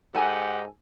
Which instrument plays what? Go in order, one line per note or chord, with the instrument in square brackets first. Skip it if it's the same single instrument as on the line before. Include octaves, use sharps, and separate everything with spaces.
[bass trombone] G#2 [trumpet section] D#4 G4 F#5 [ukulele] A4 G#5